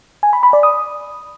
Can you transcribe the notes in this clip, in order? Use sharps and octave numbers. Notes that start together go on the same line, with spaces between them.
G#5
B5
B5
D5
D#6